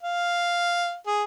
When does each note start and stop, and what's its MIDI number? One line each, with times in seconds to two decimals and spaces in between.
0.03 0.95 77
1.07 1.24 68